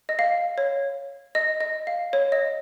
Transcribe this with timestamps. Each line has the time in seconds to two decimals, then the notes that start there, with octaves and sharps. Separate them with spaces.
0.09 D#5
0.19 F5
0.58 C#5
1.35 D#5
1.61 D#5
1.87 F5
2.13 C#5
2.32 D#5